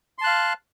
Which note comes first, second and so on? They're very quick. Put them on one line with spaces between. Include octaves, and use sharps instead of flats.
C6 A5 F#6 F5